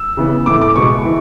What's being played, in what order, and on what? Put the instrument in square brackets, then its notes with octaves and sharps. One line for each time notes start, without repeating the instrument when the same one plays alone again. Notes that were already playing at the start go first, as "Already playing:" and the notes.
Already playing: [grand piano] E6
C#3 E3 B3
A2 E3 A3 D6
D6
B2 G#3 B3 C#6
E3